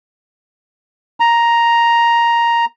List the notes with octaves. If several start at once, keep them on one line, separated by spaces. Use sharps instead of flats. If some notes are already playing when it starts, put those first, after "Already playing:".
A#5